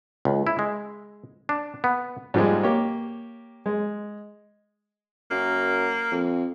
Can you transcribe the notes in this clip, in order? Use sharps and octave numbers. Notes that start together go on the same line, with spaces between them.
C#2
E4
G#3
D4
B3
G#2 F3 G3 G#3
A#3 G4 C#5
G#3
F#2 A#3
F2